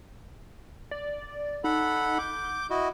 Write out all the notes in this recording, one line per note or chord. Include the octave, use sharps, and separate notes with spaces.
D5
D#4 A4 F#5 B5
D6 G6
E4 F#4 D#5